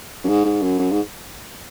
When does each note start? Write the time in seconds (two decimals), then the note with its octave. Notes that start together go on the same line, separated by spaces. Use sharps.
0.24 F#2
0.28 G#2
0.45 G#2
0.62 F#2
0.79 F#2
0.92 G#2